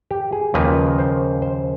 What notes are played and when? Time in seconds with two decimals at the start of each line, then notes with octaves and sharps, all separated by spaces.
0.11 G4
0.33 G#4
0.54 D#2 C#3 F3 A#3 B4
0.98 C5
1.42 C5